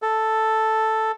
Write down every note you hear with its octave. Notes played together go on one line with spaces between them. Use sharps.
A4